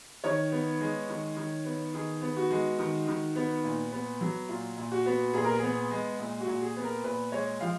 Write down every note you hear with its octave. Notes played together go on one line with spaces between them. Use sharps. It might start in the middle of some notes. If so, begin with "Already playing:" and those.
D#3 C#5
B3
G#3
D#3
D#3
B3
D#3 G#4
B3
F#4
G#3
D#3
D#3
B3
A#2
B3
F#3
A#2 F4
A#2
F#4
B3
A#2 G#4
A#4
G#4
B3
G#3
A#2
F#4
A#2
G#4
B3
A#4
A#2 B4
G#3 C#5
F3 F5